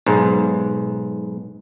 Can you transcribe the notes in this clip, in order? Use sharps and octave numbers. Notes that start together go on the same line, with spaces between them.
B1 G#2